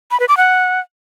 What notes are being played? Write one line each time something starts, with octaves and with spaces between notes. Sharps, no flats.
B5
B4
D6
F#5